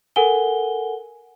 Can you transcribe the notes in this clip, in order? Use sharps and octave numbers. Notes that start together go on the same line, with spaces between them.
A4 A#4 F#5 G#5 G7